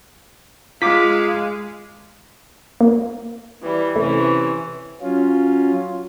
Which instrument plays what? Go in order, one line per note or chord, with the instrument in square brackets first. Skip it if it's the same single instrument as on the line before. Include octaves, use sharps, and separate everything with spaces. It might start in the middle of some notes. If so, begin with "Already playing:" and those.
[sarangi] G#3 [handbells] F4 [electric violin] F5 [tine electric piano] D6 B6
[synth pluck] A#3
[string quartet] E3 G3
[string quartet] C3 E3 C#4 [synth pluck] A3
[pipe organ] F#3 C#4 F4